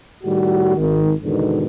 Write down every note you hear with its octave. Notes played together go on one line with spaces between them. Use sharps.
A2 D#3 G3 F#4
G#1 D#3
E2 G#2 B2 D3 D#3